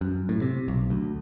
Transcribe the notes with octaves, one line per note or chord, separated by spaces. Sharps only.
F#2
A2
C3
B1
D2